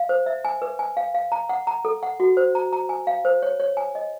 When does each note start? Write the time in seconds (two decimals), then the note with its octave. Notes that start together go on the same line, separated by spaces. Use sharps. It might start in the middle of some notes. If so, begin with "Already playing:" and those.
Already playing: F5
0.09 C5
0.26 E5
0.45 G#5
0.62 B4
0.79 G#5
0.97 F5
1.14 F5
1.32 A#5
1.49 F#5
1.67 A#5
1.85 A4
2.03 F#5
2.20 F#4
2.37 C5
2.55 A#5
2.73 A#5
2.89 G#5
3.07 F5
3.25 C5
3.42 C#5
3.60 C#5
3.77 G#5
3.95 D#5